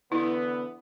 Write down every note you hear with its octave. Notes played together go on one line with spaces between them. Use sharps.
D3 E3 B3 E4